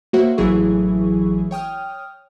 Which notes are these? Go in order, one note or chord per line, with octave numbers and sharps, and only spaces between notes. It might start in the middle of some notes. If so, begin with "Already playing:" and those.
A#3 F#4 C5 C#5 E5 F#5
A1 E3 F#3 E4 G#4 C#6
C#5 G5 D#6 F6